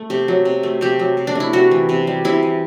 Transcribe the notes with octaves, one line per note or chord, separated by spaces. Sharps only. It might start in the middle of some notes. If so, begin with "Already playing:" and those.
Already playing: A3
C3 G4
F#3
C3
A3
C3 G4
F#3
C3
D4
A3 E4
C3 F#4
E3
C3
G3
C3 E4
E3